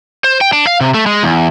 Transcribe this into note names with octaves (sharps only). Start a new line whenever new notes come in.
C5
G5
D4
F5
C3
A3
G#3
E2